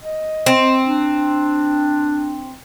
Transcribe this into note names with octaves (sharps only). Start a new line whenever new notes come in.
D#5
C4
D4